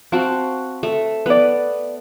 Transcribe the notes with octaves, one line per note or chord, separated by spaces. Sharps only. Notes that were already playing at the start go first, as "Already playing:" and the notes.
C4 F#4 F5 A5
A3
B3 B4 D5